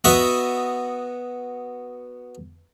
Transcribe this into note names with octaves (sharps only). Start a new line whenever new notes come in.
B3 F#4 D#5 E5